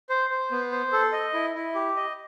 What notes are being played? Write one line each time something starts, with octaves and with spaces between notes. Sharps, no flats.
C5
C5
B3
C5
A4
D#5
E4
E4
G4
D#5